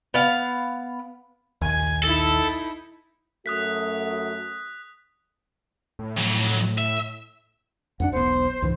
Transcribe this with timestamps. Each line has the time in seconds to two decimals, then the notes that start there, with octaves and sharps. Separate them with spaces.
0.14 B3 F5
1.62 A#1 D#2 G#5
2.04 D#4 E4 A4
3.46 F#2 A3 F#4 D#6 F#6 B6
5.99 A2
6.17 F2 F#3
6.78 E5
8.00 F2 B3 D4 F#5
8.12 E1 B1 B3 C5
8.62 C#2 G#2 E3